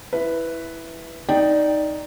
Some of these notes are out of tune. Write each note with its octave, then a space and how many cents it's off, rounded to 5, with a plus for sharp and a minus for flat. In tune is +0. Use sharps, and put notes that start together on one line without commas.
E4 +0 B4 +0
D#4 +0 D5 +0 G5 +0